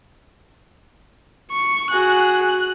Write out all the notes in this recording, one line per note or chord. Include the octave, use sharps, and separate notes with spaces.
C#6
F#4 G#4 F#6